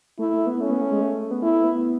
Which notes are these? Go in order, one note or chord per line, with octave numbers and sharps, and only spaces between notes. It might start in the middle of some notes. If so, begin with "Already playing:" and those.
A3 E4
A3
B3
A3 C#4
B3
A3
G#3
A3
B3
A3 E4
B3